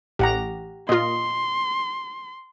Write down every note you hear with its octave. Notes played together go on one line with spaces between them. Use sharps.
A1 G4 F#5 A#5
A#2 F4 D#5 C6